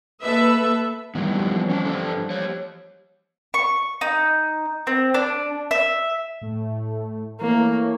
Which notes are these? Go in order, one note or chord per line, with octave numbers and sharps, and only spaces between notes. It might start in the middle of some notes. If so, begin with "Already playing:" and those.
A#3 A4 B4 E5
D#3 E3 F#3 G3 B3
F3
C#4 G5 A5
G2 D3 A4
G4 C#5
C#6
D#4
C4
D4
E5
A2 A3
E3 A3 A#3 C#5